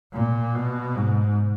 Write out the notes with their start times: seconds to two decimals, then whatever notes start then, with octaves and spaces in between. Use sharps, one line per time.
0.14 A#2
0.55 B2
0.96 G#2